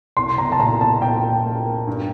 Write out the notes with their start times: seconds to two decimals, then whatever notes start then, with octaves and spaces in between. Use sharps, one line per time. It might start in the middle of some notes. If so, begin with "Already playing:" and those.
0.17 C2 C6
0.38 A#5
0.52 A5
0.59 A#2 A#5
0.81 A5
1.01 A#2 G5
1.45 A#3
1.87 G2